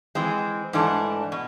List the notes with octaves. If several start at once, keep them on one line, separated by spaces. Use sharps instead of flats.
E3 G#3 C4
G#2 E3 A3 D4
B2